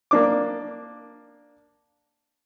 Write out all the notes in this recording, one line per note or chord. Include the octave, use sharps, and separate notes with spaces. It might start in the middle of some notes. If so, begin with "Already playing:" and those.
A#3 D4 D6